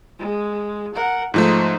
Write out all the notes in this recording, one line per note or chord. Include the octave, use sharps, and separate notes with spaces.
G#3
A#4 F#5
G#2 F3 A3 D#4 C5